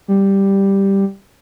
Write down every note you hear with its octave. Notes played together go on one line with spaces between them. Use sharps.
G3